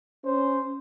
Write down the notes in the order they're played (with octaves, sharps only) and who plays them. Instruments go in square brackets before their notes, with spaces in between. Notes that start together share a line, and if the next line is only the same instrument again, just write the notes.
[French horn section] C#4 [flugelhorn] C5